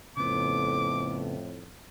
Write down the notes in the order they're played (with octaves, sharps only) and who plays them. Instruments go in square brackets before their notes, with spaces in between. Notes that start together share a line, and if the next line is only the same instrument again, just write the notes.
[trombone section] F2 A2 [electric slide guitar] C#3 B3 [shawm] D6